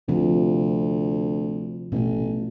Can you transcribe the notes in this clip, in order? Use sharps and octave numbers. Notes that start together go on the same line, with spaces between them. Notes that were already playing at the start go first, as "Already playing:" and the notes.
D2 C3 F3
A1 B2 A3